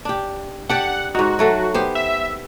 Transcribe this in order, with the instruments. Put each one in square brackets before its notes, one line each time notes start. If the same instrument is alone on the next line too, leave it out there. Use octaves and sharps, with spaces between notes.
[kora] D4 G4
[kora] D4 G4 D5 [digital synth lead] F#5
[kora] G#2 D#4 [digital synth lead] F#4
[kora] F#3 A3 A4
B3 G4 C5
[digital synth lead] E5